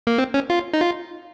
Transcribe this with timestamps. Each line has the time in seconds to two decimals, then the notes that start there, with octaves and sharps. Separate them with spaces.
0.07 A#3
0.18 C4
0.34 C#4
0.50 F4
0.73 D#4
0.81 F4